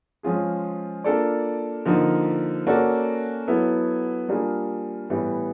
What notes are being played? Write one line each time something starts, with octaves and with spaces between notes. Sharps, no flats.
F3 G#3 C#4 F4 G#4
A#3 D4 F4 A4 D5
D3 F3 A#3 D#4
A#3 C#4 F#4 A4 D5
F#3 B3 E4 A4
G3 A#3 D4 F4 G#4
A2 E3 G3 B3